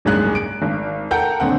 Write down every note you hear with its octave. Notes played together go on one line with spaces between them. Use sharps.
F#1 C2 G#2 C#4 G#4 F#6
D7
G#1
A4 A#4 F#5 G5 A#5 G6
D#1 D3 C4 F#5